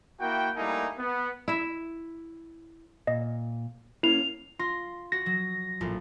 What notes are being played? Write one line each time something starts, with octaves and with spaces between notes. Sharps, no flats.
A#3 E4 F#4 G5
G3 A3 A#3 D#4 E4 G#5
B3
E4 E5
A#2 D#5
A#3 C#4 E4 C7 F7
F4 C6 A#6
F#4 A#6
F#3
A#1 A2 F4